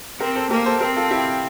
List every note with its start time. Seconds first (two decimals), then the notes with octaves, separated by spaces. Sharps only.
0.20 C4 G4 A#4
0.36 A4 C5
0.51 A#3 G4 A#4
0.66 A4 C5
0.81 C4 G4 A#4
0.96 F4 A4
1.11 E4 G4